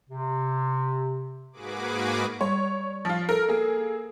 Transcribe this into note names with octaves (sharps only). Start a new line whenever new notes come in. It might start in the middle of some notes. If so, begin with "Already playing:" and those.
C3
G#2 A#3 F#4 G#4 B4 D6
G3 C#5
F3 F4
A4 A#4
A#3 G#4